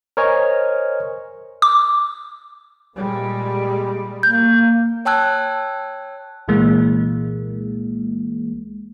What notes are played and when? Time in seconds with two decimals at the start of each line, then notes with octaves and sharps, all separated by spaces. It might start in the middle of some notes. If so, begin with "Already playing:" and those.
0.17 A#4 C5 C#5 D#5 G#5 F6
1.62 D6
2.96 A#2 G3 G#3
4.23 A#3 G6
5.05 C#5 G5 A5 E6 F#6 G#6
6.48 C2 A#2 E3 G#3 A#3